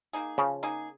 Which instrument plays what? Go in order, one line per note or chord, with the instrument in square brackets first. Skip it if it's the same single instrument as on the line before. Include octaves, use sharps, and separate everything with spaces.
[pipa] A#3 D#4 G#4
[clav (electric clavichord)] C#3 [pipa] F3
[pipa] A#3 D#4 G#4